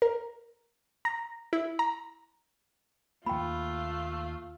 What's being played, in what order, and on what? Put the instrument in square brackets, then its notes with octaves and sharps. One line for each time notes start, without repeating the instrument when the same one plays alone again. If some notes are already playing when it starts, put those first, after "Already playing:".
[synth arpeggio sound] A#4
A#5
E4
A#5
[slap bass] D#2 A#3 [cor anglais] A3 [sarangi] F4 [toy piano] G5 B5